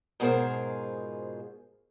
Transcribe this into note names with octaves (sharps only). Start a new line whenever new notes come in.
G#2 B2 F4 G#4 A#4 C5